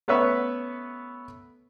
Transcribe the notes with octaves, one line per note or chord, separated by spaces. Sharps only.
A3 B3 C#4 B4 C#5 E5